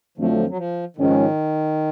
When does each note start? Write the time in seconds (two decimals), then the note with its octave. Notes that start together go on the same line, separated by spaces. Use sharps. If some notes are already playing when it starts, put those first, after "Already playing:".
0.17 F2 D3 F3 F#3 A3 C4
0.49 F#3
0.57 F3
0.97 G#2 D#3 F3 G#3 C#4